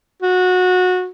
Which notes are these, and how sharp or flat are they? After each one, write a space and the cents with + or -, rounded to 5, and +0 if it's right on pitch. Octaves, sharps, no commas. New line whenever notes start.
F#4 -20